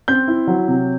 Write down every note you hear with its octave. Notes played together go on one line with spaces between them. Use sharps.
C4 G6
E4
F#3
C3